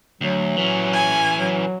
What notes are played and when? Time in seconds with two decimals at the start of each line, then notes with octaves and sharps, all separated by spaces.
0.21 D2 F#3
0.57 E3 C#4
0.93 G#5
1.38 F#3